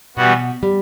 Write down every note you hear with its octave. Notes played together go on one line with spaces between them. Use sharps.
B2 E3 G3 B3 F#4
G3